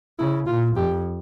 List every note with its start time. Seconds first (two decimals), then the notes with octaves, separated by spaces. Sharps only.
0.19 C#3 E4
0.47 A#2 F4
0.76 F2 G4